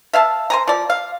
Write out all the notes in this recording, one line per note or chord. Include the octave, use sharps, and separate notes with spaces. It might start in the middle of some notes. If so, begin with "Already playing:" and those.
E5 F5 G#5 A5
C5 G#5 A#5
F3 D5
F5